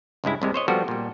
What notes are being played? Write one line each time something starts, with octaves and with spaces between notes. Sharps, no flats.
C#2 G2 G#3 E4
C2 C3 G#3
C5 C#5 D#5
F3 G3 B3 F#4 A4
A#2 G3